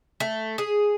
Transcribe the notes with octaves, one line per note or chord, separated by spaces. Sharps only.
A3
G#4